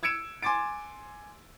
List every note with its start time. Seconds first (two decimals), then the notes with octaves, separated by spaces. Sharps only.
0.03 E6 G#6 C#7 D7 E7
0.42 G#5 C6 D6 A6 D7